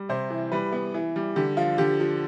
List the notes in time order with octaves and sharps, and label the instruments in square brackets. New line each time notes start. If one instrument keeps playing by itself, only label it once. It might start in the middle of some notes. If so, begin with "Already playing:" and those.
Already playing: [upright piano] G3
C3 C5
E3
G3 B4
B3
E3
G3
D3 G4
F3 F4
D3 G4
F3